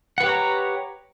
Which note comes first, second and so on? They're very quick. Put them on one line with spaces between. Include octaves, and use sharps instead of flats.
F#5 B4 G4 C#5 A#5